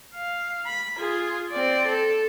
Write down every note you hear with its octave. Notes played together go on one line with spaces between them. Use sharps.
F5
B5
F4 G#4
C4 D5
A4